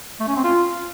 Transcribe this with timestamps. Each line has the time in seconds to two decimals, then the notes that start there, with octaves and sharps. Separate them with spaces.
0.20 A3
0.28 C#4
0.36 C4
0.44 F4